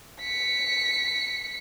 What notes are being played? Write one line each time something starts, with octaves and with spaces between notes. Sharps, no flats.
B6 C#7